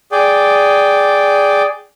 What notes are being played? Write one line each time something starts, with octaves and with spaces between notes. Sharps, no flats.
G#4 D5 G5